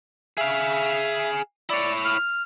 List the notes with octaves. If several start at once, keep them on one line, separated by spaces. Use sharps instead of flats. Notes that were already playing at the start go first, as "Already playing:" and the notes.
G#4 E5 F5
E4 C#5 D5
F6